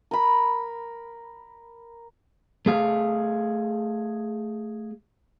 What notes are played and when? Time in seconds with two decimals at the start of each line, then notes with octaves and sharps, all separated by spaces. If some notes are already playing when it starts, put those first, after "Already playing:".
0.11 A#4 B5
2.66 A3 G#4 F5